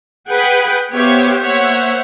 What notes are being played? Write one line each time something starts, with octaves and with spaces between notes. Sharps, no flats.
G#4 B4 F#5 G5
B3 G4 C5 C#5 E5 F5
A#3 C5 C#5 E5 F#5